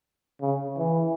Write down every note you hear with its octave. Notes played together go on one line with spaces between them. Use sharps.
C#3
E3